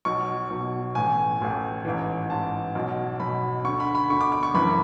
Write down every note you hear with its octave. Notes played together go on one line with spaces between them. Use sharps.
B1 B2 C#6
B1 B2
A1 A2 E3 G#5
A1 A2 E3
A1 G#2 E3
A1 G#2 E3 A5
B1 B2
B1 B2 B5
D2 D3 C#6
B5
B5
D2 D3 C#6
D6
D6
C#6
F#1 F#2 E3 B5